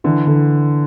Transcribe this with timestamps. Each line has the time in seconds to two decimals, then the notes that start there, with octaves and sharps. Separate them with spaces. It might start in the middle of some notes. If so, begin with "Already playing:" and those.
0.04 D3 E3
0.27 D3